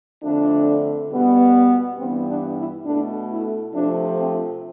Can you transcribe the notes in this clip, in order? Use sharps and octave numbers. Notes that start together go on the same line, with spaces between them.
F2 D3 A3 D4
B2 G3 B3
G2 E3 G3 B3 C4
D4
E4
B2 A3 D4
E4
C3 F3 A3 D4
C4